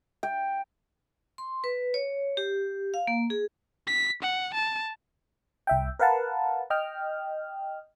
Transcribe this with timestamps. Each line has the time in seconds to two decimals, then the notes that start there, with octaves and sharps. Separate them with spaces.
0.23 G5
1.38 C6
1.64 B4
1.94 C#5
2.37 G4
2.94 F5
3.07 A#3
3.30 G#4
3.87 B6
4.22 F#5
4.54 A5
5.67 C2 E5 G5
5.99 A#4 B4 F5 F#5 A5
6.70 D#5 G5 F6